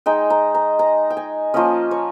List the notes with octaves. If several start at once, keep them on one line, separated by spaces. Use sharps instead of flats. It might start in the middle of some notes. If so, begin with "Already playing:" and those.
G#3 D#4 G5
A#5
A#5
A#5
G5
G#5
F3 A#3 C#4 D#5
C#5